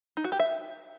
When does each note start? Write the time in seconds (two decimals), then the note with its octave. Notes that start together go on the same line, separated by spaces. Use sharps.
0.17 D#4
0.24 F#4
0.32 G4
0.39 E5